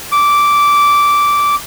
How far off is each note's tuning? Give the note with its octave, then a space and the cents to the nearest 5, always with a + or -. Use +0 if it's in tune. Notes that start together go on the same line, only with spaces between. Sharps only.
D6 -10